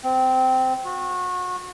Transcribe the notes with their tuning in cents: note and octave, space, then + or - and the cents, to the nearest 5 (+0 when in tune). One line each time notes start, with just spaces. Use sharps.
C4 -15
F#4 -30